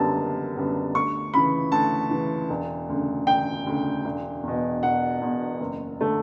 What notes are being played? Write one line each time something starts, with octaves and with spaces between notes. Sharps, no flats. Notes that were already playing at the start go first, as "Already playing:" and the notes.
Already playing: F#1 F#2 D3 G3 B3 A5
F#1
F#2 D3 G3 B3
D2 C#6
C#3 E3 B5
D2 A5
C#3 E3
E1
D2 C#3
E1 G5
D2 C#3
E1
E2 B2
E1 F#5
E2 B2
F#1
D3 A3